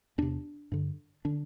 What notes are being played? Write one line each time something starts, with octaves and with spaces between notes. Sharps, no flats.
E2 C3 D4
G2 D3
D3 D4